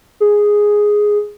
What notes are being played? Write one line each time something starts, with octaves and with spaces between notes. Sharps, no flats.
G#4